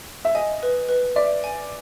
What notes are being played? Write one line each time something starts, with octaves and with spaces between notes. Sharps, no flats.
E5
D#5 G#5
B4
B4
D5 E5
G#5